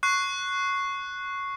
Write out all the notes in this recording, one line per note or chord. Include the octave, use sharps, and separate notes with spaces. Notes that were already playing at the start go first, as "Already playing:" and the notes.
C#6 F#6 C7